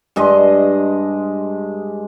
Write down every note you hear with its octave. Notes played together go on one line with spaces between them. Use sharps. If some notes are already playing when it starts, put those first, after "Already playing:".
G2 G#3 D#5